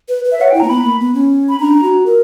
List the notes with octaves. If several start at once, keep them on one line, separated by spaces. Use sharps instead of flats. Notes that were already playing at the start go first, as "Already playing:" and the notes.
B4
B4
E5
C#5 F#5
E4 G5
A#3 A#5
B3 B5
A#3
B3
C#4
B5
D4 A#5
F#4
A#4